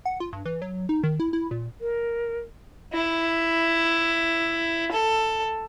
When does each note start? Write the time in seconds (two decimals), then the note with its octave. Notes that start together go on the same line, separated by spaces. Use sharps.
0.05 F#5
0.20 F4
0.33 G2
0.45 E3
0.62 F#3
0.89 D#4
1.03 D#3
1.20 E4
1.33 E4
1.51 A#2
1.81 A#4
2.93 E4
4.92 A4